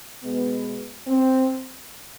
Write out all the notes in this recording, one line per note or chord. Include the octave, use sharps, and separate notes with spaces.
B2 G#3 B3
C4